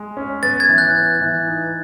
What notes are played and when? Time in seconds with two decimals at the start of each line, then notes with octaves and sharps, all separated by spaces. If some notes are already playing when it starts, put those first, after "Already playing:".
Already playing: G#3
0.17 C#4
0.43 B3 A6
0.60 G#6
0.69 E3
0.78 F#6
0.95 B3
1.21 E3
1.47 D#4